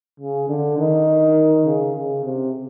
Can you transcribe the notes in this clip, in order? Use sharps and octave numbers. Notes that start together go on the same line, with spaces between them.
C#3
D3
D#3
C#3
C#3
C3